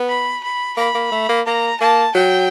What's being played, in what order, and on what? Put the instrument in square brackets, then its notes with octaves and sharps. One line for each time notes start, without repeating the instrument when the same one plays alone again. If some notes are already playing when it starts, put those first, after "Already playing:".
Already playing: [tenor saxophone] B3
[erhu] B5
B5
[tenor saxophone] A#3 [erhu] B5
[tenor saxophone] A#3
A3
A#3
[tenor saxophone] A#3 [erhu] A#5
[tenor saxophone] A#3 [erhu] A5
[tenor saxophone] F#3 [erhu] G5